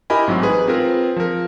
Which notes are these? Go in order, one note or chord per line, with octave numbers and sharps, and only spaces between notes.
E4 G4 A#4 D#5 G#5 B5
A1 G#2 F#3 G#3 C4
D#4 G#4 B4
C4 F4 G#4 A#4 B4
F3 A#4